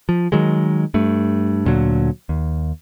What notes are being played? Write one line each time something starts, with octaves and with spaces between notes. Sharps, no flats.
F3
D#3 F#3 G#3
G2 A3
D2 A#2 D3 F#3
D#2